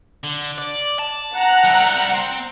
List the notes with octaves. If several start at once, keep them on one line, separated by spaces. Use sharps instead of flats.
D3
D5
A5
F#5 A#5 F#6
G3 E4
C4